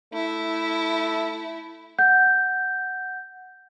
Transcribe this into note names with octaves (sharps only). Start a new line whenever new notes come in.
A3 E4
F#5 G6